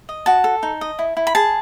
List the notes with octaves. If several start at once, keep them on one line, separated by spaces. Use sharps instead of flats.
D#5
F#4 A5
A4
D#4
D#5
E4
E4
B5
G#4 A5